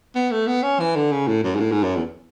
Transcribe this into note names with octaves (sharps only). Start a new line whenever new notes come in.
B3
A3
B3
C#4
E3
D3
C#3
A2
F#2
G#2
A2
G#2
F#2
E2